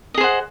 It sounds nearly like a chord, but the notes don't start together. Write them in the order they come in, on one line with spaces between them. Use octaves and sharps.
D#5 G#4 C5 F#5